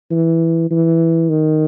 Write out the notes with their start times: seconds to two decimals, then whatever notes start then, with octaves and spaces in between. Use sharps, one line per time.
0.11 E3
0.71 E3
1.29 D#3